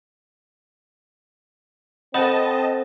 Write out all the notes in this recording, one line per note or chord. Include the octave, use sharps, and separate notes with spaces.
C4 A4 C5 D#5 F#5 A5 B5 E7